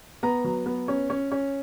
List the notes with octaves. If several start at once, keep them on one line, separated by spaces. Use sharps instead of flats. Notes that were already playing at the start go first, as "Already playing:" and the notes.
B3 A#5
F#3
B3
C#4
C#4
C#4